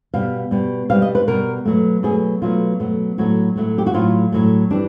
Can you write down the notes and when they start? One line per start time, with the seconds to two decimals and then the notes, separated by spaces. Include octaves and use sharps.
0.14 B2 G3 F5
0.51 B2 G3
0.90 B2 G3 F5
1.02 D#5
1.15 B4
1.28 B2 G3 A#4
1.65 B2 F#3 A3
2.03 B2 F#3 A3 G#4
2.42 B2 F#3 A3 F4
2.80 B2 F#3 A3
3.18 A2 F#3 A3 F#4
3.56 A2 F#3 A3
3.78 G4
3.86 F#4
3.94 A2 F#3 A3 F4
4.32 A2 F#3 A3
4.70 E3 G3 D4